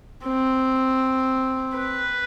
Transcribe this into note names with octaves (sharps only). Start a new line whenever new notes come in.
C4
B4